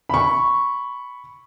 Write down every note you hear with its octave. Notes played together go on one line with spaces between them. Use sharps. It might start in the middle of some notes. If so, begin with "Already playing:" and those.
B5 C#6